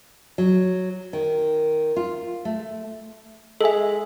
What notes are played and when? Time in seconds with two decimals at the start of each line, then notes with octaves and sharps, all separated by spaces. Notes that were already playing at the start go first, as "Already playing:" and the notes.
0.38 F#3
1.13 D#3
1.96 F4
2.45 A3
3.61 G#3 A4 E5 G#5 F#7